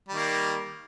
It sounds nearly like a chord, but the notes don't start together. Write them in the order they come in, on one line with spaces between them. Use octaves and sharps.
G3 D#3 A#3